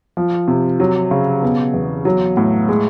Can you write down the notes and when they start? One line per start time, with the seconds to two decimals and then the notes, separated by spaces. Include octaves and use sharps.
0.17 F3
0.48 C3
0.80 F#3
1.11 C#3
1.42 B2
1.74 E2
2.05 F#3
2.37 A2
2.69 G#3